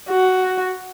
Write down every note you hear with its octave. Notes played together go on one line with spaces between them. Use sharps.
F#4